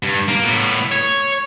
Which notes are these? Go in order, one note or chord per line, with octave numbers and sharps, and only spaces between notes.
G2
A#3
A2 B3
C#5